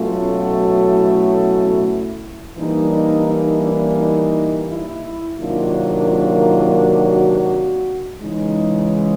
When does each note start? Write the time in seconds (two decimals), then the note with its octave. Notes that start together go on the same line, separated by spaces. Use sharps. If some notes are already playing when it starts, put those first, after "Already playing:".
Already playing: B2 F#3 A3 C#4 F4
0.46 E4
2.58 E3 G3 A#3 D4 D#4
2.92 D#4
3.27 D#4
3.62 D4
3.97 D#4
4.68 E4
5.38 C3 D#3 F#3 A#3 D4 F4
6.09 F4
6.79 F#4
8.19 C#3 E3 G#3 D#4